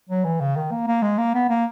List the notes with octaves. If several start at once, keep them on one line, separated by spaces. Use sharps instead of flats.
F#3
E3
C#3
D#3
A#3
A#3
G#3
A#3
B3
A#3